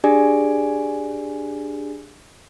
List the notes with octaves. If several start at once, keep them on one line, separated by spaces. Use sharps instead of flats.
D4 G4 G#4 D5 G#5